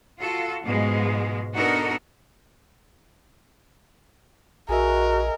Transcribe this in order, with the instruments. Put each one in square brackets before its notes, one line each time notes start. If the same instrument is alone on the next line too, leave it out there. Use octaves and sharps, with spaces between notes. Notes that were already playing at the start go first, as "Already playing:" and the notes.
[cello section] F4 F#4 A4
G#2 B2 F3 G#3
B3 D4 D#4 F#4 A4 A#4
[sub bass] A#1 [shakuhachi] F#4 [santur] G#4 D#5 E5 [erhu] A#4